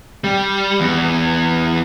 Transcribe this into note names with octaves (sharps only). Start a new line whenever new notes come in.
G3
E2